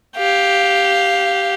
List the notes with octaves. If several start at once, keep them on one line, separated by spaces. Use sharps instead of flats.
G4 F5